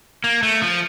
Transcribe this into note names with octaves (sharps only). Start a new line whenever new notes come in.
A#3
A3
F3